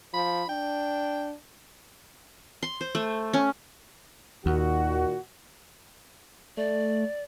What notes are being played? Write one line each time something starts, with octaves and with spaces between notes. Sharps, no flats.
F3 B5
D4 G5
C6
C5
A3
C#4
D#2 A#2 D#3 F#4
A3 D5